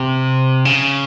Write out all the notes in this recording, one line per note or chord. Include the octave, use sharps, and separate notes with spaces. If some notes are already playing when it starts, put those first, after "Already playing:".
Already playing: C3
C#3